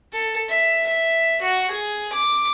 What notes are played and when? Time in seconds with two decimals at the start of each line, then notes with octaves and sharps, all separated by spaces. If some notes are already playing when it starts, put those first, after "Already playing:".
0.13 A4
0.49 E5
0.87 E5
1.42 F#4
1.71 G#4
2.13 D6